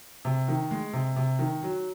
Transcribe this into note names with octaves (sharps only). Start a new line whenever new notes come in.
C3
D#3
G#3
C3
C3
D#3
F#3